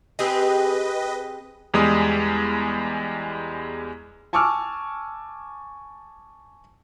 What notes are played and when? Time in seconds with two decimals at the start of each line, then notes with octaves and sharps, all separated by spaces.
0.19 C4 G4 G#4 B4 D#5
1.74 E2 G3 G#3 D#6
4.33 G#5 A5 C#6 D6 E6 F6